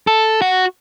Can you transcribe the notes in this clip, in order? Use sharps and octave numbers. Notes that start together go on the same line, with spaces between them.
A4
F#4